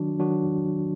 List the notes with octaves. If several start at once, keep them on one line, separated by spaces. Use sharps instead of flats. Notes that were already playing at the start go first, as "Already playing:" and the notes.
Already playing: D#3 F#3 D4 F#4
D#3 F#3 D4 F#4